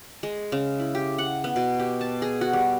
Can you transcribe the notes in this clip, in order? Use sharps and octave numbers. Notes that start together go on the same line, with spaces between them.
G#3
C#3
E4
G4
F#5
B3
B2
G4
A5
G#4
F#4
G3